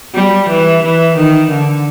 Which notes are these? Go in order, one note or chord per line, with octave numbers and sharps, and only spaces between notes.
G3
E3
E3
D#3
D3